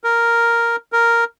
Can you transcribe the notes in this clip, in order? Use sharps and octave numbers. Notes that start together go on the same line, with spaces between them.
A#4
A#4